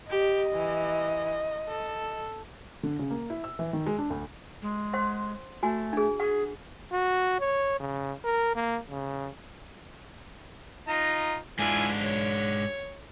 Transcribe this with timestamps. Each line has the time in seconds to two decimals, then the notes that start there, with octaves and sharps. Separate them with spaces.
0.10 G4 D#5
0.54 E3
1.68 A4
2.83 D3
2.99 C#3
3.11 A#3
3.30 E4
3.44 E6
3.59 E3
3.73 D#3
3.86 G#3
3.98 D4
4.10 D2
4.62 G#3
4.93 C5 F#5 C6
5.63 A3 F#4 G#5
5.93 D4 G#4
6.20 G#4 F#5
6.93 F#4
7.40 C#5
7.80 C#3
8.24 A#4
8.55 A#3
8.90 C#3
10.88 D#4 F4 A#5
11.59 G#2 D4 E4 F4 G#5
12.03 C#5